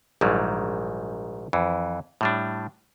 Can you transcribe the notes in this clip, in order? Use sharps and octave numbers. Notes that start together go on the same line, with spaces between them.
A#1 G#2 D#3 F#3 G3
F2 E3
A2 G3 D4